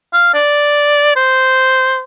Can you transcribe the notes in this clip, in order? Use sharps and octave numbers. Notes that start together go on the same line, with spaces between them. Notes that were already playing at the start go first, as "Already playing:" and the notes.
F5
D5
C5